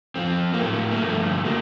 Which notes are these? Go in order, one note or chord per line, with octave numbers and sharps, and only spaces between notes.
F2 D3 F3 C4
A#3
A2 F#3 A3
A#3
G2 D3 F3 A3
F#3 A#3